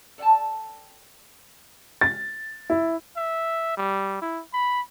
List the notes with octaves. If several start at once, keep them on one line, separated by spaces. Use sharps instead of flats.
A4 D5 F5 G5 A5
A6
E4
E5
G3
E4
B5